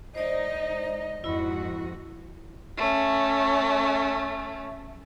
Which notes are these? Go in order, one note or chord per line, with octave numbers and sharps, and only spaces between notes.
G#3 D#4 C5 D5 D#5
F2 G#2 E4 F#4 B5
A3 C#4